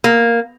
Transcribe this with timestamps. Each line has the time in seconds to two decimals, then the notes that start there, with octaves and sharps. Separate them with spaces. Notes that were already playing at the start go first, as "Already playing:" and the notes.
0.04 A#3